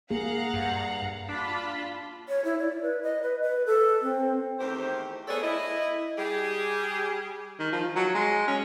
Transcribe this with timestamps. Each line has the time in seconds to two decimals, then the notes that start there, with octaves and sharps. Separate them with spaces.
0.11 A#3 G#4 F5 F#5 A#5
0.54 G2
1.29 D4 F4 A5 B5
2.29 C#5
2.45 E4
2.59 D5
2.82 B4
3.03 D#5
3.23 B4
3.42 B4
3.66 A4
4.02 C4
4.59 E2 D#3 A3 G4 C5
5.28 A3 B3 G#4 A4 C#5 D5
5.42 E4 D#5
6.17 G3 G4 G#4
7.59 D#3
7.72 F3
7.96 F#3
8.14 G#3
8.47 C#4